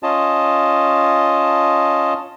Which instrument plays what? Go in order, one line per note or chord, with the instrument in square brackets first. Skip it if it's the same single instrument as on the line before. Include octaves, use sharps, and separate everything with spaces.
[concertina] C#4 F4 D#5 A5